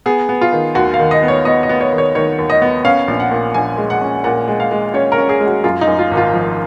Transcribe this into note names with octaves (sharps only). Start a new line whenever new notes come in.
B3 G#4
B3
F4
D#3
D#2 F#4
F5
D#3
D#5
B3
C#5
B3 D#5
D#5
B3
C#5
D#3
C#5
D#3 C#5
D#2
D#5
B3
C#4 F5
A#1
F#5
A#2
A#1 G#5
G#3
F#5
C#4
A#2 F#5
G#3
F5
G#3
C#4 C#5
A#4
C#4
G#4
G#3
F#4
F#2 F4
D#4
F#2
F4
G#1
F4
F3